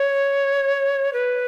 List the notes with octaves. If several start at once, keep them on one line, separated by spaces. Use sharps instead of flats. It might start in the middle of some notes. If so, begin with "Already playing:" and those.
Already playing: C#5
B4